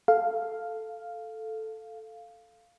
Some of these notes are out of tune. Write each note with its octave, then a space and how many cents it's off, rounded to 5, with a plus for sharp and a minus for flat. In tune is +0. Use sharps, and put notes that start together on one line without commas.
A4 +0 F5 +0